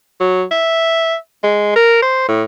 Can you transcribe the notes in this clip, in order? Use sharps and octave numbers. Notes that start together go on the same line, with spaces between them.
F#3
E5
G#3
A#4
C5
A2